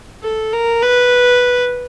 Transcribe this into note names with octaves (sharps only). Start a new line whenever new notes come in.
A4
A#4
B4